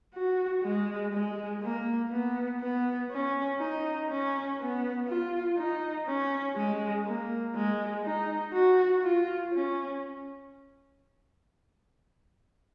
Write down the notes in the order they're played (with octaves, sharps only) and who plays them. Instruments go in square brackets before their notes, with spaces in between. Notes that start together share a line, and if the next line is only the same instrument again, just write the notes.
[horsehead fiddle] F#4
G#3
G#3
A#3
B3
B3
C#4
D#4
C#4
B3
F4
D#4
C#4
G#3
A#3
G#3
D#4
F#4
F4
C#4